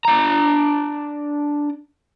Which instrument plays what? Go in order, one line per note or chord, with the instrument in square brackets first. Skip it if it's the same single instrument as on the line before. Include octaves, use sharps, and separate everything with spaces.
[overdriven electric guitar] D4 A#5